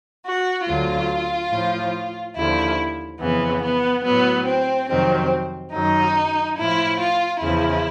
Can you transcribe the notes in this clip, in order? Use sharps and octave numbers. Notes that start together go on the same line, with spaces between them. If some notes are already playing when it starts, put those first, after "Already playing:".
F#4
D2 D3 F#3 F4
A2 F3
D#2 D3 F3 E4
F2 C#3 E3 B3
B3
A2 F#3 B3
C4
F2 C3 D#3 F#3 C4
F#2 D#3 F#3 D#4
A2 F3 E4
F4
E2 C#3 F3 E4